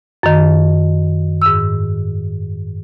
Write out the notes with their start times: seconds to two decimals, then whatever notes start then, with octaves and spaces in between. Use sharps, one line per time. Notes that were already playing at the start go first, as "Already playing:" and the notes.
0.23 F#2 D#3
1.42 G#2 E6